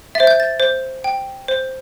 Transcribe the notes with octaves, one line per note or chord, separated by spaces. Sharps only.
C5 E5 A6
G6
A6
C5
G5
C5